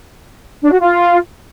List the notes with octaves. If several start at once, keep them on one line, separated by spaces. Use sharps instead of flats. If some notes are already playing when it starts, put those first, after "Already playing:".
D4
F#4
F4